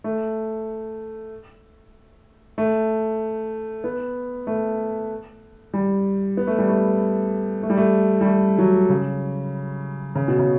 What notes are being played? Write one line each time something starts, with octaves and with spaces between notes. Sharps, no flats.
A3
A3
B3
A3
G3
B3
A3
G3
A3
A3
G3
A3
G3
A3
F#3
C#3
C#3
B2
C#3